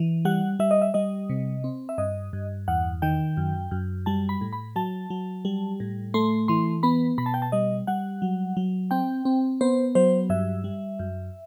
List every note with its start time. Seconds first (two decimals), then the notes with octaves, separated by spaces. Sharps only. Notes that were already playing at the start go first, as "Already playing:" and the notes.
Already playing: E3
0.25 G3 F#5
0.59 G3 E5
0.71 D#5
0.82 E5
0.94 G3 D#5
1.30 C3
1.64 C4
1.89 E5
1.98 G2 D#5
2.33 G2
2.68 E2 F#5
3.02 D#3 G5
3.37 F#2
3.71 F#2
4.06 G3 A5
4.29 B5
4.41 A2
4.53 B5
4.76 F#3 A5
5.10 F#3
5.45 G3
5.80 A2
6.14 A3 C6
6.48 E3 C6
6.83 B3 B5
7.18 B2 B5
7.26 A5
7.34 G5
7.42 A5
7.52 G3 D#5
7.87 G3 F#5
8.22 F#3
8.57 F#3
8.91 C4 G5
9.25 C4
9.61 B3 C5
9.95 F#3 C5
10.30 G2 E5
10.64 G3
10.99 F#2